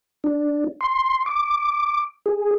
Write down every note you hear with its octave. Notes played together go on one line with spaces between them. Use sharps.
D4
C6
D6
G#4